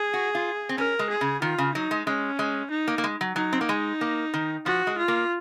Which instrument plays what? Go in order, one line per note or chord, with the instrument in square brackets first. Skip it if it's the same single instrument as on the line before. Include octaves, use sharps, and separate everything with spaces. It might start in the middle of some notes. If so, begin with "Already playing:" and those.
Already playing: [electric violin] G#4
[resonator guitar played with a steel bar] F#4
F4
C4
[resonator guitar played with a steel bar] C#4 [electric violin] A#4
[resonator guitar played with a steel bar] G#3
[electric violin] G#4
[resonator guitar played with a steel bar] C#3
[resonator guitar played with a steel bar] D#3 [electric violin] F4
[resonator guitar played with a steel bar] C#3
[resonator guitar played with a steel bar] F#3 [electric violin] D#4
[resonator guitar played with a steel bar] G#3
[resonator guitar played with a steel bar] G#3 [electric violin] C#4
[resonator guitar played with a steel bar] G#3
[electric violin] D#4
[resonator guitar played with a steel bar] A#3
A#3
G#3
F#3
[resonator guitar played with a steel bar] F#3 [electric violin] D#4
[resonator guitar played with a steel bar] C4
A#3
G#3
A#3
D#3
[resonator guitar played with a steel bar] F3 [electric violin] F#4
[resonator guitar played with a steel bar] G#3
[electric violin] F4
[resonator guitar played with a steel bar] A#3